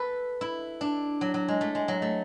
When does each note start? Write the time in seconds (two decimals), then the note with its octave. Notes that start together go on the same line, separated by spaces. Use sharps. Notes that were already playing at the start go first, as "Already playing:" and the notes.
Already playing: A4 B4
0.41 E4
0.81 D4
1.21 F#3
1.34 F#3
1.48 G#3
1.61 A3
1.75 G#3
1.88 F#3
2.02 A3